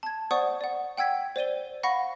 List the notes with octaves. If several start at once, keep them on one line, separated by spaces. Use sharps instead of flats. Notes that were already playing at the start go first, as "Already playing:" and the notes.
A5 G#6
C5 D5 F#5 C#6 D#6
D5 F#5
F#5 G5 E6 G#6 B6
C5 D5 D#7 G7
F5 F#5 B5 C#6 A#6 C#7